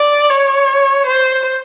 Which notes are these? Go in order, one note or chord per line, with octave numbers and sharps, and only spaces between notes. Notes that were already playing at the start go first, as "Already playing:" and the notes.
Already playing: D5
C#5
C5